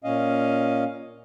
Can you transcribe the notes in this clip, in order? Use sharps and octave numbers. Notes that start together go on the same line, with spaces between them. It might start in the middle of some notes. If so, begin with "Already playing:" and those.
A#2 C#4 D#5 F5